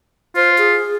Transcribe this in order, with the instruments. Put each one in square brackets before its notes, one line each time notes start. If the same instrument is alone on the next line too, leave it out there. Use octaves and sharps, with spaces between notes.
[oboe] F4 [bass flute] C5
[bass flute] G#4